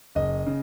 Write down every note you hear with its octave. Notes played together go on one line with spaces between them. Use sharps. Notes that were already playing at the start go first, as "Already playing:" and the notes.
F#1 D#5
C#3